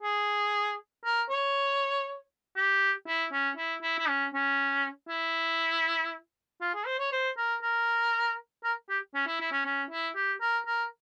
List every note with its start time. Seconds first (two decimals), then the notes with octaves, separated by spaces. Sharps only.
0.03 G#4
1.05 A#4
1.30 C#5
2.56 G4
3.07 E4
3.32 C#4
3.57 E4
3.82 E4
3.98 E4
4.08 C#4
4.34 C#4
5.09 E4
6.61 F4
6.74 G#4
6.86 C5
6.99 C#5
7.12 C5
7.37 A#4
7.62 A#4
8.64 A#4
8.89 G4
9.14 C#4
9.27 E4
9.40 E4
9.52 C#4
9.65 C#4
9.90 E4
10.15 G4
10.41 A#4
10.66 A#4